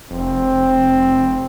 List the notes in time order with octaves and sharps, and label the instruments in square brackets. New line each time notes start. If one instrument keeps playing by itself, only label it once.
[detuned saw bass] F1 [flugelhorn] C4